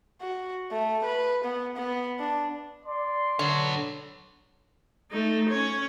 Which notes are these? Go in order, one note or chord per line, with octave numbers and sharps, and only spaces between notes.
F#4
A3
B4
B3
B3
D4
D5 C6
D3 B3 C#5
A3 D#4
C#4 C#5